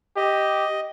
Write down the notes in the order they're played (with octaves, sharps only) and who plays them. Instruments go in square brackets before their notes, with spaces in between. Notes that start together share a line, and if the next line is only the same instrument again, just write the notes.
[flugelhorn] G4 [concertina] D#5